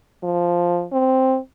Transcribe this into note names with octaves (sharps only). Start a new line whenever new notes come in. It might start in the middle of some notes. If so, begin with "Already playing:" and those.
F3
C4